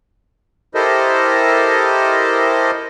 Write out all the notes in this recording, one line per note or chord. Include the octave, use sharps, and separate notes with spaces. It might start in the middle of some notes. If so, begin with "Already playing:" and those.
E4 G4 A4 A#4 C5 D#5